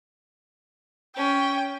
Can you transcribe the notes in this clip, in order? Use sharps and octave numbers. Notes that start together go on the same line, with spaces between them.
C#4 G5